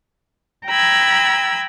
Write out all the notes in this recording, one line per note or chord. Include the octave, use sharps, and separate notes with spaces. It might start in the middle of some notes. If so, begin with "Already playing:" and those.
G5 A#5 B5 E6 G#6